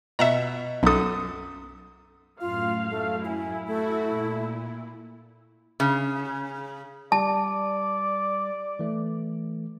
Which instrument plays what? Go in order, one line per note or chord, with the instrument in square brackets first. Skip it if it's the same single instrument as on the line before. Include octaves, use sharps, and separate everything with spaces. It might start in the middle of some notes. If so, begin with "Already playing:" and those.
[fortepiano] B2 [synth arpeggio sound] E5 F#5 A#5
[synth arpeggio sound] B1 A4 [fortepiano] F#2 D#6
[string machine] F#2 A2 [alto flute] F4 [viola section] F5
[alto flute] A3
[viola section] E4 [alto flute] G#5
[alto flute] A3 [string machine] F#4
[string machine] A#2
[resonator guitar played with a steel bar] C#3
[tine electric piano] G3 [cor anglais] D5 [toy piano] A5
[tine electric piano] E3 A3